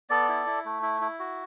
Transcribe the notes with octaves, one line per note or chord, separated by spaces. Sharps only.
B3 A4 D5
E4
E4
A3
E4
E4
F#4